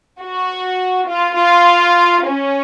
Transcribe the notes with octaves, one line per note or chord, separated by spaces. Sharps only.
F#4
F4
F4
C#4